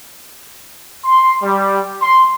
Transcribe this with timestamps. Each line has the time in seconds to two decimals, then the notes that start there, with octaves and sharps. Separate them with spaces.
1.04 C6
1.43 G3
2.02 C6